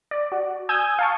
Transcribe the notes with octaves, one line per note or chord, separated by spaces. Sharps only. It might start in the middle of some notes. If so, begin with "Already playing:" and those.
D5
F#4
G#5 D#6 E6 G6 G#6 D#7
F5 A5 C#6